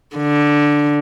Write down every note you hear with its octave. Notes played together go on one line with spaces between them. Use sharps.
D3